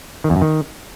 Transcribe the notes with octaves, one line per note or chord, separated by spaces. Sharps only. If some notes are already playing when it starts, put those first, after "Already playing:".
D#3
E2
F#2
D#3